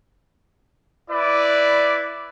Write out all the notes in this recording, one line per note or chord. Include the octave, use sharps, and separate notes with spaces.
E4 B4 D5